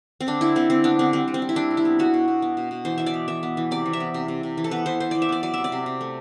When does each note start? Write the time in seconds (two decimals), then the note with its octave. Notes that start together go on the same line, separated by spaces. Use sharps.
0.21 C4
0.27 D3 D4
0.41 D3 E4
0.55 D3 C4
0.70 D3 C4
0.84 B3 D4
0.99 D3 C4
1.13 G3 C4
1.28 G3
1.34 C4
1.42 G3
1.49 E4
1.56 G3 D4
1.71 C3
1.77 E4
1.85 B3
1.99 B3 F#4
2.14 B2
2.28 B2
2.42 B3
2.57 B2
2.71 B2
2.85 E3 C5
2.98 E3 E5
3.06 D5
3.14 B3
3.28 E3 E5
3.43 B3
3.57 E3
3.71 C3 D5
3.86 E3
3.93 E5
4.00 B3
4.14 C3
4.28 C3
4.43 C3
4.57 E3
4.64 A4
4.71 B3 B4
4.86 E3 C5
5.00 E3 C5
5.11 E3 D5
5.22 E5
5.29 B3 D5
5.43 F#3 D5
5.54 C3 E5
5.64 D5
5.72 C3
5.86 C3
6.01 A3